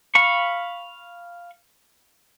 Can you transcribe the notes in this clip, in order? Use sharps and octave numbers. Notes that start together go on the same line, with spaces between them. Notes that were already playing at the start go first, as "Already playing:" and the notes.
F5 B5 C#6